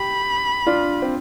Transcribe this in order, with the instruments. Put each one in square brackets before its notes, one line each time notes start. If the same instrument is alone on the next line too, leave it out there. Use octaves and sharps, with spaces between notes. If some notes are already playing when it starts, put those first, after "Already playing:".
Already playing: [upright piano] G4 [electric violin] B5
[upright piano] D4 F4
C4